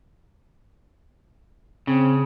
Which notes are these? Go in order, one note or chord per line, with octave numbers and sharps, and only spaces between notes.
C#3 C4